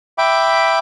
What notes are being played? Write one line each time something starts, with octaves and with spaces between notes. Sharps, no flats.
E5 G5 B5 D6